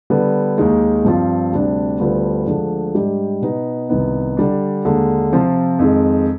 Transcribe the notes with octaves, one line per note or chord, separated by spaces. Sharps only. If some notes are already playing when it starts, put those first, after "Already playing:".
D3 G3 B3
D#2 D#3 G#3
G2 F3 C4 F4
D2 C3 G3 D4
D2 D3 G3 B3 F4
D2 D3 F3 G#3 D4
G#2 G3 D4 G4
B2 B3 D#4
C2 C3 D#3 B3
D3 G3 D4
D#2 D3 G#3
C3 F3 C4 F4
F2 D#3 G#3